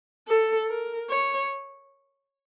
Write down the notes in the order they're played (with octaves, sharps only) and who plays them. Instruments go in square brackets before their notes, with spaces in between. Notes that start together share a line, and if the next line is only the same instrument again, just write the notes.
[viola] A4
A#4
C#5